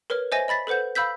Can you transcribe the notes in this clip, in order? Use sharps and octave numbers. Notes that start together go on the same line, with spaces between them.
A#4 B4 C#5 F6
C5 C#5 D#5 E5 G#5 A#6
D#5 B5 A6 B6
A4 B4 C5 F#5 G6
F5 B5 E6 G6 B6